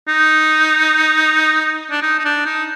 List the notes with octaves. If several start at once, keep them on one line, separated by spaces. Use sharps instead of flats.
D#4
D4
D#4
D#4
D4
D#4